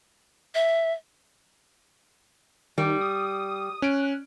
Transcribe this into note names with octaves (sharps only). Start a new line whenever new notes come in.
E5
D#3 G3
D#6
C#4 F#6 D7